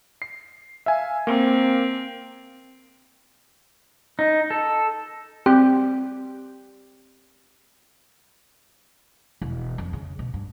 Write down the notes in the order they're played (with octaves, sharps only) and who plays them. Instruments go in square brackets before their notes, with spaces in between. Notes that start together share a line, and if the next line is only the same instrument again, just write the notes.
[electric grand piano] C7
E5 F5 G#5
[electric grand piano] A#3 [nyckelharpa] C4
[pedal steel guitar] D#4
A4
[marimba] C4 [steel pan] G4
[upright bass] E1
F2
C#3
B2
G2